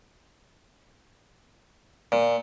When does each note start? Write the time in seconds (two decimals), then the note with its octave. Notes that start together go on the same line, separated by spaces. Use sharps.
2.12 A#2